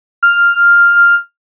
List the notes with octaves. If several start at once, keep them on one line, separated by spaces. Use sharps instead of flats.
F6